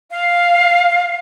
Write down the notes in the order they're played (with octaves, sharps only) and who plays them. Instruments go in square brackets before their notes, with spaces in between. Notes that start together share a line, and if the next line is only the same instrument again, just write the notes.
[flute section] F5